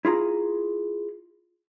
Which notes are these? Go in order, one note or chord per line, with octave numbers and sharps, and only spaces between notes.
E4 F4 G#4 A#5